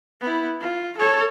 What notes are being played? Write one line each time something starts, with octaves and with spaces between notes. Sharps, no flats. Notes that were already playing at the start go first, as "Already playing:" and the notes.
B3 E4
F4
A4 C#5